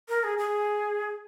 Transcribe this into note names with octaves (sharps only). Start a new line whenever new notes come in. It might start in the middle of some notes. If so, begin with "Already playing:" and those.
A#4
G#4
G#4